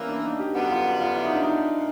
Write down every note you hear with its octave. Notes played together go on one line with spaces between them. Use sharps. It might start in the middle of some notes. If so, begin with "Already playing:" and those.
Already playing: E3 G3 A#3 B3 C#4
D4
D#4
G4
F#2 D3 G3 B3 F#4
F4
F4
E4
D#4
D4
D#4
A#2